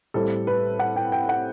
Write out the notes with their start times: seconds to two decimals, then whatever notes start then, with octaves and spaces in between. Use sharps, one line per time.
0.14 A2 G3 C4 A4
0.47 B4
0.79 F#5
0.96 G5
1.12 G5
1.29 F#5